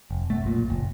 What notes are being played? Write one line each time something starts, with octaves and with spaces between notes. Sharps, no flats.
F1
F#2 A3
B1 A#2
F#1